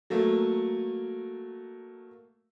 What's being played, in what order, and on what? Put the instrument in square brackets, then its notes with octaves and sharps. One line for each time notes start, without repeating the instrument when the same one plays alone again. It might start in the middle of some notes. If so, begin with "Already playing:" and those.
[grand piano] F#3 A3 A#3